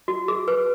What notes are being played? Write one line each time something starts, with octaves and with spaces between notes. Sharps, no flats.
F#4
G#4
B4